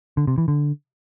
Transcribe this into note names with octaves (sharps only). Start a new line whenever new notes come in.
D3
C3
E3
D3